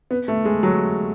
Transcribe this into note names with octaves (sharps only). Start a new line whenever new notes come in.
B3
A3
G#3
F#3